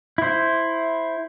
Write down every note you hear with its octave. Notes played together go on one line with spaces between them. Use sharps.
E4 C5